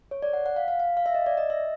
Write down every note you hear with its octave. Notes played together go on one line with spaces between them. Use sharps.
C#5
D5
F#5
F#5
F5
F5
F5
F5
E5
D#5
D5
D#5
E5